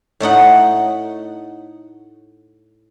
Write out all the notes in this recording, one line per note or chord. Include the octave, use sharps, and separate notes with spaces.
A2 A3 D#4 F#5